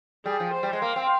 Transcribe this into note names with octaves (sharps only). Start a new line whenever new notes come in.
G3 G#4
F3
C5
G3
G#3
A#3 F5
C4